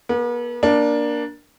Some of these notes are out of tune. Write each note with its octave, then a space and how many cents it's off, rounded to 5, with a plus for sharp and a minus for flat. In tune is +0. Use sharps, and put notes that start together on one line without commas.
B3 -45 A4 +0
A#3 +20 D4 +0